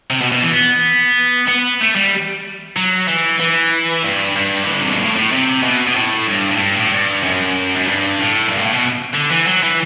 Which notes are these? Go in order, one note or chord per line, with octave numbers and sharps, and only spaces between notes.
C3
B2
B2
E3
B3
B3
A3
G3
F#3
E3
E3
G2
G2
E3
D3
C3
B2
A2
A2
C3
B2
B2
A2
G2
A2
G2
A2
G2
F#2
F#2
G2
A2
F#2
G2
B2
A2
B2
D3
E3
F#3
E3